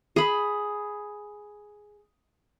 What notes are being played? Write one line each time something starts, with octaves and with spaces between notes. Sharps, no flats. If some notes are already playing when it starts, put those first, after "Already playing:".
G#4 B5